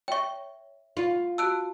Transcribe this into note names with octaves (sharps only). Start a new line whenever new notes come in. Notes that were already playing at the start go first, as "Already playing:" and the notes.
C#5 E5 G5 C#6
F4
F#4 A5 E6 F#6 D7